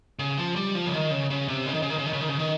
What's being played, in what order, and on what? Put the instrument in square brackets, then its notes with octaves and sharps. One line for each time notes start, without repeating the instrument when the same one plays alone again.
[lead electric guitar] C#3
F3
G3
F3
C#3
D#3
C#3
C#3
C3
C#3
D#3
C#3
D#3
C#3
D#3
C#3
D#3
C#3
D#3